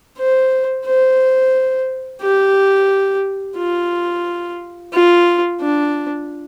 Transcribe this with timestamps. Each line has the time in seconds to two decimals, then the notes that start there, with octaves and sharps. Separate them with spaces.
0.18 C5
0.86 C5
2.22 G4
3.57 F4
4.93 F4
5.61 D4